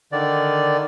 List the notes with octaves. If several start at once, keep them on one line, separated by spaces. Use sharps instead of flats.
D3 D#3 D5